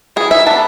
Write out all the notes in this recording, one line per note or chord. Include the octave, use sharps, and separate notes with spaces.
E3 G#4
E5
B3 D4 A5